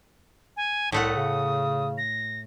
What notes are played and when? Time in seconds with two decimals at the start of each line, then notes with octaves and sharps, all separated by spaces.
0.57 G#5
0.92 C2 A2 A3 F#5 D#6
1.16 C#3
1.98 A#6